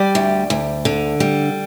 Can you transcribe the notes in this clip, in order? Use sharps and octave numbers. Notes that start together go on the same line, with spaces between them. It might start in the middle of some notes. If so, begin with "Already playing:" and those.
Already playing: G3 D5
D2
D2
D3
G3